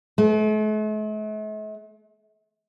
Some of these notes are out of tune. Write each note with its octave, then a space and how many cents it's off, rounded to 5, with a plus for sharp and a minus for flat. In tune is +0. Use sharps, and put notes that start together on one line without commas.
A3 -45